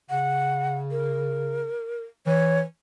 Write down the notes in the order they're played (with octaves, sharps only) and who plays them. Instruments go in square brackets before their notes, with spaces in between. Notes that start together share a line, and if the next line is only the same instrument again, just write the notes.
[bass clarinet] C#3 [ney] F#5
[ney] A#4
[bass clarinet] E3 [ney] C#5